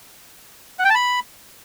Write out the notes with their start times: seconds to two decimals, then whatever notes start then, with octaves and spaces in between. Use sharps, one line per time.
0.79 F#5
0.84 G5
0.90 A5
0.95 B5